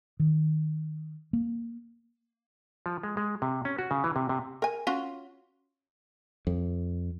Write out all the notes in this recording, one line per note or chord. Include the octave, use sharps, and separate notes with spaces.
D#3
A#3
F3
G#3
G#3
C3
C#4
F#4
C#3
E3
C3
C3
A#4 G#5
C#4 F4 F#4
F2